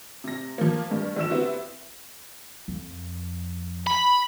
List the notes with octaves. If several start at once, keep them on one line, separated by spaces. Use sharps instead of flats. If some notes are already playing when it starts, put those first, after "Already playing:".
C3 A#6
F3 A#3
G2
A#1 D3 E6 E7
B3 C4 E4 F#4 G4
F2
B5